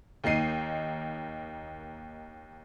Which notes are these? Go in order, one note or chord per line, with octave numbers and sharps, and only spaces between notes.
D#2 A#3 D#4 C7 D#7